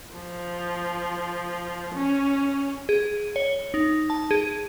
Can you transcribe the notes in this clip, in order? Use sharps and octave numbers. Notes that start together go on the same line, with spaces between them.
F3
C#4
G#4
C#5
D#4
A5
G#4